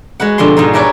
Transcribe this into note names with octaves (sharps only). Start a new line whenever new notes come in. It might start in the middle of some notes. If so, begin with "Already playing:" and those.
G#3 F#4 B4 F#5
B2 D3 F3 G4 C6
G#2 B2 F3 G#3 D#4
E4 G4 A#4 B4 C#5 D5